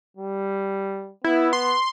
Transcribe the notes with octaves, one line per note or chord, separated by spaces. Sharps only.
G3
B3 E4
C6